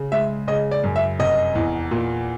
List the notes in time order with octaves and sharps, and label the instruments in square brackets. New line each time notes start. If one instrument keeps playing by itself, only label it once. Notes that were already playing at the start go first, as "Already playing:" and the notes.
Already playing: [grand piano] C#3
G#3 E5
C#3 D#5
D5
F#2
E5
F1 D#5
E2
A#2